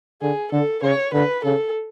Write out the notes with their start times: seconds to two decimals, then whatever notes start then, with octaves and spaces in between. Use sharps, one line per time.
0.21 D3 G#4
0.52 D3 A4
0.83 C#3 C#5
1.13 D3 B4
1.44 C#3 A4